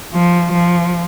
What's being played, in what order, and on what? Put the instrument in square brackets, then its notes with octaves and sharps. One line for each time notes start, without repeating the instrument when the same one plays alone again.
[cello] F3
F3